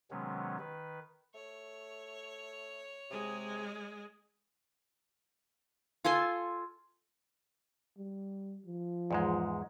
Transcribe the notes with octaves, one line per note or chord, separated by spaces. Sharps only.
C3 D#3 F#3 G#3 B3 C#4
D#3 B4
A3 C#5
C3 G#3 G#4
F4 A4 G#5 C6
G3
F3
E2 G#2 G#3